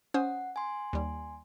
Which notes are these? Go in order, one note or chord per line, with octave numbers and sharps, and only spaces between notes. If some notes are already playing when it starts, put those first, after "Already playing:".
C#4 C5 F#5 D#6
G#5 C6
D#2 G3